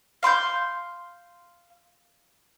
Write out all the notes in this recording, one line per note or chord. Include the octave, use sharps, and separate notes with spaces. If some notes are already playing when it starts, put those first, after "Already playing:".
F5 C6 D6 G6